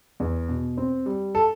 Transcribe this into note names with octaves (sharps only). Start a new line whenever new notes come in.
E2
B2
C4
G3
A4